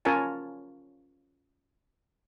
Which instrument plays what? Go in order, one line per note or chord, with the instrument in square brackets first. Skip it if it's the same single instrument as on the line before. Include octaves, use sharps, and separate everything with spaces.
[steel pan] C#4 F4 A#4 C#5 G#5 A5